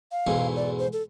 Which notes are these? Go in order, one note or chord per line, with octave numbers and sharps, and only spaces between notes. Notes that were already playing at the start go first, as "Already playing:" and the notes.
F5
B1 E2 G#2
D5
C5
A4